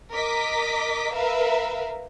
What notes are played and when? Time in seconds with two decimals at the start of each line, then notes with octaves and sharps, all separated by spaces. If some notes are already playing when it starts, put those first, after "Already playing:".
0.13 A#4 D#5 D6 B6
1.14 A#4 B4 E5 F5